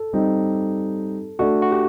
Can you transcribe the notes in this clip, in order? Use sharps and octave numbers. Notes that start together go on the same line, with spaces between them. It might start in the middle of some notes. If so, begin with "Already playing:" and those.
Already playing: A4
G3 C4 D#4 G4
A3 D4 F#4 A4 D5
F#4
G4